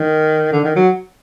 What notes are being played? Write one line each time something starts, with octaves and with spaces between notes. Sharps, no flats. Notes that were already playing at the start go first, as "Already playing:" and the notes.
Already playing: D#3
D3
D#3
F#3